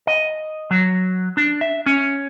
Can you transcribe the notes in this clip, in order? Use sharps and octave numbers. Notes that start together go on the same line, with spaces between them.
D#5
F#3
D4
E5
C#4